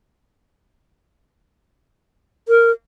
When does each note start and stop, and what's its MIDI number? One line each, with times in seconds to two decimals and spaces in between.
2.48 2.71 70